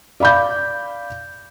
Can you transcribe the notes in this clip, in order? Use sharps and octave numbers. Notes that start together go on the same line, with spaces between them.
D5 F5 B5 D6 G6